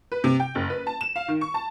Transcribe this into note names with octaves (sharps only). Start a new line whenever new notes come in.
B4
C3
G5
F#1
B4
A5
E7
F5
D#3
C#6
A5